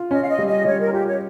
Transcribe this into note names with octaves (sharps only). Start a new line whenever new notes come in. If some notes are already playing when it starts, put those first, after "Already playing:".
Already playing: F4
C#4 D#5
F5
D#5
G3
D#5
G3 C#5
A#4
F4 G4
C#5